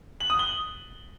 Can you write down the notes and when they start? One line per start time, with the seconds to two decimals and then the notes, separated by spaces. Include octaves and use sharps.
0.20 F#7
0.30 D#6
0.39 G7